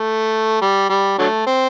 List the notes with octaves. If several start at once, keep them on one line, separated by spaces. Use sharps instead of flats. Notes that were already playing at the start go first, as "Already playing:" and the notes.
Already playing: A3
G3
G3
D3 F#3 A3
C4